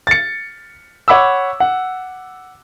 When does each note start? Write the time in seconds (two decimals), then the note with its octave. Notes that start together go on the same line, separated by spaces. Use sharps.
0.07 A6 C#7
1.08 C#5 F#5 B5 D6 E6
1.60 F#5